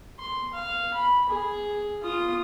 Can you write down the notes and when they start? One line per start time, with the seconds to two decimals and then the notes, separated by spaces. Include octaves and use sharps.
0.19 C6
0.53 F5
0.94 B5
1.29 G#4
2.03 F4 D#6